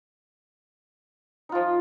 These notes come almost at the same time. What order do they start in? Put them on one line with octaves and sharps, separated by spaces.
D#4 F4 F3